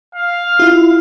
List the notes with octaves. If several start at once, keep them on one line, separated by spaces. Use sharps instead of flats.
F5
E4 F4